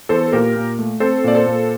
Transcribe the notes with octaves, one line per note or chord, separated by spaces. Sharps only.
E2 A4 C5
A#2 G4 A#4
A#2
A3
C4 A4 C5
A#2 D5
A4 C5
A#2